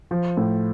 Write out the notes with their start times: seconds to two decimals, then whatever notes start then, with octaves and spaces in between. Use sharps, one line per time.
0.11 F3
0.37 A2